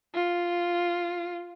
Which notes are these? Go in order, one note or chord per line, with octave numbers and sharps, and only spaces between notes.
F4